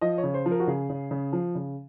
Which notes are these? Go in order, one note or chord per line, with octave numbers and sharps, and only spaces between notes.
F3 D#5
C#5
C#3
C5
F3
A#4
F#4
C#3 G#4
C#3
C#3
F3
C#3